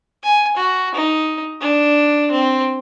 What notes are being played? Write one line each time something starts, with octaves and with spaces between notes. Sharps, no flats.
G#5
F#4
D#4
D4
C4